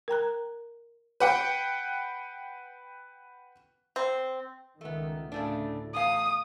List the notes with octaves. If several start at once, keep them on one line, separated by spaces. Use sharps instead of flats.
A#4 G5 A#5 F#6
B4 F#5 G5
C4
C#2 D#3 A3 B3
D2 A2 C#3 A3 D4
E2 F5 D#6